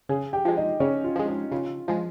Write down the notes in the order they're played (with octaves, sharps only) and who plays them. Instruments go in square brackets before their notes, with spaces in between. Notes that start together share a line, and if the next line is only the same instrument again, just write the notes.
[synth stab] C#3 [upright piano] G#4 G#5
[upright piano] G4 G5
[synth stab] F3 G#3
[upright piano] D#4 D#5
[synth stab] C#3 [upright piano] C#4 C#5
[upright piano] F4
[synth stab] F3 G#3 [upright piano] F4
[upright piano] D#4
[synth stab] C#3 [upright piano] F4
[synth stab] F3 G#3 [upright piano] F4